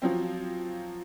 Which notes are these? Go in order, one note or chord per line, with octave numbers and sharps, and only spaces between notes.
F3 F#3 C4